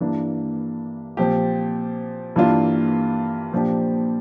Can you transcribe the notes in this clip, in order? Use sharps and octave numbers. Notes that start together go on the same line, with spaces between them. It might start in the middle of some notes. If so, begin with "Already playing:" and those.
G2 E3 A#3 D4
A#2 F3 C4 G4
G2 E3 A#3 D4 F4
A#2 F3 A#3 D4 G4